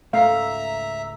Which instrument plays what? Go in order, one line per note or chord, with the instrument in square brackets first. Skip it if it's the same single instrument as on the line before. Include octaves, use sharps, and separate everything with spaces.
[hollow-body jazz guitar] C#2 G#2 A3 [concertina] E5 [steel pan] F5 [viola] A#5